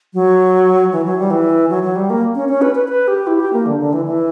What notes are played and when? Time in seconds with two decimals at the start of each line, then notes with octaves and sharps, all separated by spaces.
0.14 F#3
0.92 E3
1.05 F#3
1.18 G3
1.30 E3
1.70 F#3
1.83 F#3
1.96 G3
2.10 A#3
2.35 C#4
2.49 C#4
2.62 B4
2.75 B4
2.88 B4
3.08 G4
3.27 E4
3.40 G4
3.53 A#3
3.66 D3
3.80 D3
3.93 E3
4.05 E3